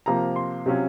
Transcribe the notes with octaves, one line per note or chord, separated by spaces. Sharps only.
C3 F3 A#3 A#5
C6
C3 F#3 C#4 F4